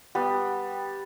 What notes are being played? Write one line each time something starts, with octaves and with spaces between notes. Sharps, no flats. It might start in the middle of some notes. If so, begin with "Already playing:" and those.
G3 B3